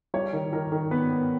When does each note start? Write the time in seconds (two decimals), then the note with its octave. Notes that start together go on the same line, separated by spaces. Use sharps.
0.14 G3 C#5
0.33 D#3
0.53 D#3 A#4
0.72 D#3
0.91 B3 B4
1.11 B3